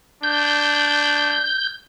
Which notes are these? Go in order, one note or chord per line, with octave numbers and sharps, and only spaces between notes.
D4 G6